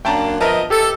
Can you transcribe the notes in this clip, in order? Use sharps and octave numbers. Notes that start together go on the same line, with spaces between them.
F#2 A#3 D4 G5 A5 A#5
F3 B3 A#4 D#5 E5 A5
G4 A4